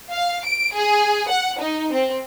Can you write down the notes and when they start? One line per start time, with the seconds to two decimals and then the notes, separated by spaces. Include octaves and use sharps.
0.12 F5
0.46 D7
0.75 G#4
1.29 F#5
1.60 D#4
1.93 C4